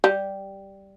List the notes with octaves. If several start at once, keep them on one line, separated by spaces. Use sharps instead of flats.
G3